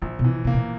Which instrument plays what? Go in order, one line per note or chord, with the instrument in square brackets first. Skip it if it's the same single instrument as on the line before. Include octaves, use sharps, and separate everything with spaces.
[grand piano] A#1 [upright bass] D#3
[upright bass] B2
[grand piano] E3
[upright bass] B2 [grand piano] A#3
[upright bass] A#2